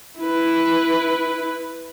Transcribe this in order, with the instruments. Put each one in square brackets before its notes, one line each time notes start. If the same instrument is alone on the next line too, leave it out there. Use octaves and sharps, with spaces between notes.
[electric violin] E4 B4